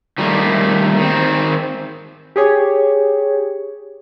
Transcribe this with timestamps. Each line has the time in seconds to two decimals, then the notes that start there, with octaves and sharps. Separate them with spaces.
0.18 D#3 G3 A3 A#3
0.97 D#3 C4
2.36 G4 G#4 C#5